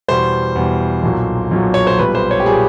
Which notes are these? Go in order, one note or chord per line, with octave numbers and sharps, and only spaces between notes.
E2 B2 G3 C5
E2 B2 G3
B1 A#2 F#3
B1 A#2 F#3
C#5
C5
B1 A#2 G3 B4
C5
C#5
G4
A#2 G3 G#4